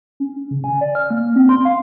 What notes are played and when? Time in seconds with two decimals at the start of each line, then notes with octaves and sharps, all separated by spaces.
0.20 C#4
0.32 C#4
0.51 C#3
0.64 G#5
0.81 D5
0.95 F6
1.10 A#3
1.36 C4
1.49 C6
1.65 F5